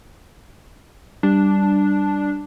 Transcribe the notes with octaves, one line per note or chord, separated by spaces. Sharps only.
G3 D4